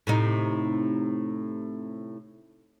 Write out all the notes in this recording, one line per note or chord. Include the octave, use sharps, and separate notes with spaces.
A2 C3 D#4